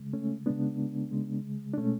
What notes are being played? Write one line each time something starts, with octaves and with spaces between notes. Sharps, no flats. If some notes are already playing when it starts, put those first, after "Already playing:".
Already playing: C#3 G#3
A3 C#4
C#3 G#3 B3 D4
C#3 G#3
D4
B2 G#3 A3 C#4